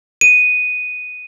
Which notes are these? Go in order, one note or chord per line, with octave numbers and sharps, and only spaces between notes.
D#7